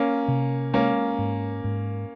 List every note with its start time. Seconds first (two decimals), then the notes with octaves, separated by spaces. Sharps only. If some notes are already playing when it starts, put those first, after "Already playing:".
Already playing: A#3 C#4
0.28 C3
0.74 G#3 A#3 C#4
1.18 G#2
1.64 G#2